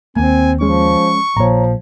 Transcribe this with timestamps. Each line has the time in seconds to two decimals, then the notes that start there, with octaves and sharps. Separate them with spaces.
0.16 D#2 A#3 C4 G#5
0.61 F3 G#3 C#4 C#6
1.37 A#1 A#2 F3 C#5 A#5